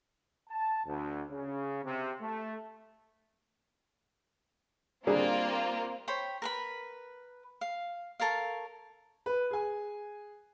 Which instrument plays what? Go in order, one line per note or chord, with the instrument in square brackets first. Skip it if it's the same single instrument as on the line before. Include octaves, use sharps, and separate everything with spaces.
[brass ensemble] A5
D2
C#3
C3
A3
[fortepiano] G3 D4 G#4 [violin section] A#3 C4 F4
[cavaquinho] C5 C#5 G5 B5
A#4 B4 B5
F5
A4 A#4 C#5 F5
[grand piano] B4
G#4 G#5